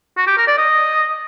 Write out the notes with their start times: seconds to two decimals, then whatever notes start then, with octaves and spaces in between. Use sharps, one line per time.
0.17 F#4
0.27 G4
0.38 A#4
0.48 D5
0.58 D#5